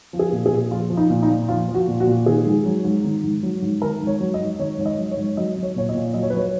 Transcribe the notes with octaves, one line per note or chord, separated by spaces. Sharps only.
F3
G#4
A#2
G#4
A#2
F3 F4
F3
D#4
A#2
D#4
A#2
F3 F4
F3
F#4
A#2
F#4
A#2
D#3 G#4
G#2
F#3
G#2
D#3
G#2
F#3
G#2
D#3 A#4
G#2
C#5
F#3
D#5
G#2
D#3 C#5
G#2 C#5
D#5
F#3
C#5
G#2
F#3 D#5
F#3
C#5
A#2 C#5
D#5
A#2
F#3 D#5
C#5
B4
F#3 C#5